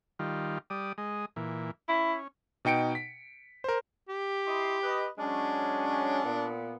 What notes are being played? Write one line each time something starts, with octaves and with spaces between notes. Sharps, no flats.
D#3 G3 F4
G3 D5 D#6
G#3 D#5
A#2 E3
C#4 E4
B2 D#4 G5 C#7 D7
B6
A#4 C5
G4
E4 D#5 C6
B4 D#5
F#3 G#3 C#4 D4
A#2 B3